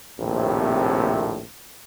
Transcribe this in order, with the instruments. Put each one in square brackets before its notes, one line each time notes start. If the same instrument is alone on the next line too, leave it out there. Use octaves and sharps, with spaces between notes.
[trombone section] A#1 D#2 A2 C3 C4